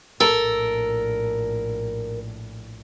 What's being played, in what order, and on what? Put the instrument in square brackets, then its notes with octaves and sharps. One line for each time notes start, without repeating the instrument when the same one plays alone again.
[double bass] A#1 A2 [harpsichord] A4 [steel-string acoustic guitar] A#4